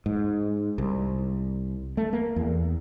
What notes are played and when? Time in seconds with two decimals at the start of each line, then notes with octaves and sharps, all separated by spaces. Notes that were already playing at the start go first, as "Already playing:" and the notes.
0.06 G#2
0.78 C2
1.97 A3
2.13 A#3
2.36 E2